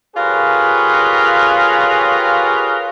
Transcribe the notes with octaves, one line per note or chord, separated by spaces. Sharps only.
F4 G4 G#4 A#4 B4 C#5